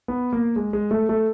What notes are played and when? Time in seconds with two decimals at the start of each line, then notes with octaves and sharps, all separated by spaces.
0.08 B3
0.33 A#3
0.56 G#3
0.73 G#3
0.91 A3
1.09 A3